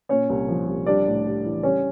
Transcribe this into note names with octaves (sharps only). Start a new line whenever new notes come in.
A#2 C#4 C#5
C2
F3
C2
G3 D4 D5
A2
G3
E3
G3 C#4 C#5